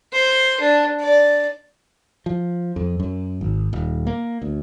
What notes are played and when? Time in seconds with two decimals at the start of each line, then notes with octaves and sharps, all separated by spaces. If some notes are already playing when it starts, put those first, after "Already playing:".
0.12 C5
0.60 D4
1.00 D5
2.26 F3
2.76 F2
3.00 F#2
3.41 G#1
3.73 D#1
4.07 A#3
4.42 D2